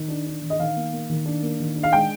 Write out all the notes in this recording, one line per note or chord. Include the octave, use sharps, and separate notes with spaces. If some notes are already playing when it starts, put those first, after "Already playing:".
Already playing: D#3
D4
D4
D#3
D#5
D#3 F5
A#3
A#3
D#3
D4
A#3
D#3
D4
F5
G#3 G5